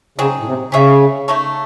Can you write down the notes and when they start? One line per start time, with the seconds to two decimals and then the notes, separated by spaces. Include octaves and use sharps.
0.18 C#3 F#3 C4 D#4 G#4
0.40 A2
0.46 C3
0.72 C#3 C#4 G#4 C#5 E5
1.28 A3 D#4 A4 C#5